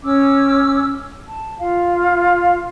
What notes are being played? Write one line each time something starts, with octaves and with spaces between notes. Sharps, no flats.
C#4 D6 E6
A5
F4 F5